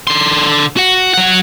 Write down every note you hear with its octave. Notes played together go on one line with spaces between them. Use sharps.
D3 C6
F#4 F#5
F#3 F#5